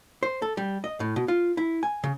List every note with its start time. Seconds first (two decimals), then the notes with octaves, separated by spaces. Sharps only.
0.23 C5
0.42 A4
0.57 G3
0.84 D#5
1.00 A2
1.16 B2
1.28 F4
1.57 E4
1.83 G#5
2.04 C#3